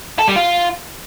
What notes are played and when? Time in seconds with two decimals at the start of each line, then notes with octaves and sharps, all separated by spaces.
0.19 A4
0.28 G3
0.36 F4